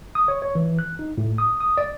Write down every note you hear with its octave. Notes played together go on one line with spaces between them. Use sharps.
D#6
C#5
C#5
E3
F#6
D#4
A2
D#6
D#6
D5